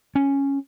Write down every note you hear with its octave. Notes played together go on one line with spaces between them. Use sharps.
C#4